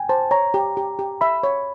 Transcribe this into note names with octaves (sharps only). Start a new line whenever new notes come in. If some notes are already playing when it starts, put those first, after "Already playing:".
Already playing: G5 G#5
C5 A5
C#5 A#5
G4
G4
G4
E5 B5
C#5